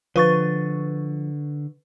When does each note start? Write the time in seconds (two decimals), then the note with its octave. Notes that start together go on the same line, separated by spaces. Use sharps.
0.16 D3 F3 B4 C#6 A6